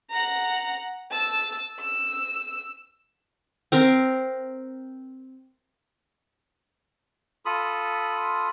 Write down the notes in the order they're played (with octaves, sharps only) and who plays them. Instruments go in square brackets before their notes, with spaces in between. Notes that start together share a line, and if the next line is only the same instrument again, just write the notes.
[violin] F#5 A#5
A5 E6
E6
[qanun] C4 A#4 C6
[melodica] F4 A4 B5 D#6